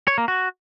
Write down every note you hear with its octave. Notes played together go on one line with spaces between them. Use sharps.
C#5
A#3
F#4